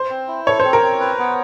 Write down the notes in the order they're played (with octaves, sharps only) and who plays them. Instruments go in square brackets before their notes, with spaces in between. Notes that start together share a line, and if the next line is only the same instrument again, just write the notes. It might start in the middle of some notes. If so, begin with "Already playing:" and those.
Already playing: [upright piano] C5
[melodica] C4
E4
[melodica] A4 [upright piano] C#5
[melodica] C4 [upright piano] C5
[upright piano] A#4
[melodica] C4
B4
B3